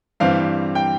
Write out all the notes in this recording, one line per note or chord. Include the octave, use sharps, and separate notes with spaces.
G2 E3 G3 C4 F5
G5